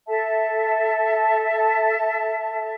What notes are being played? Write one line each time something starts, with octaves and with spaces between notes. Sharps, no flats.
A4 E5 A5